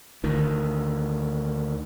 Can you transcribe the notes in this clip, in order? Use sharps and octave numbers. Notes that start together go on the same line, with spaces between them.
D2 D#3